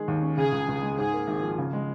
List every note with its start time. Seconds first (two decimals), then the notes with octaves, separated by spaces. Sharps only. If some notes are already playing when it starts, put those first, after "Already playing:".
Already playing: D#3 G#3 G#4
0.08 D#2
0.22 C#4
0.37 C#3 G#4
0.52 C#2
0.68 C#2
0.82 G#3
0.98 G#2 G#4
1.13 A#3
1.28 G#1
1.43 F3
1.58 C#3
1.73 G#3